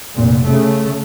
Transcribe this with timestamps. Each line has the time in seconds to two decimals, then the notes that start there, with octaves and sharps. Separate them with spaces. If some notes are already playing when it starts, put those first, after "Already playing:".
0.16 F1 A#2
0.45 C#3 A3